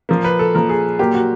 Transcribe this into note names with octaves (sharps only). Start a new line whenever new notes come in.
A#2 F3 A#3
B4
A4
A#2 F3 A#3 A#4
G#4
A#2 F#3 A#3 G4
F#4